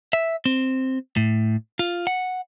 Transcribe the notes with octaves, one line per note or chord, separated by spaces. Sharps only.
E5
C4
A2
F4
F#5